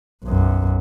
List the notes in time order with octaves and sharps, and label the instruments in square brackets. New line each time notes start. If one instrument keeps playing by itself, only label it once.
[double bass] B1 F#2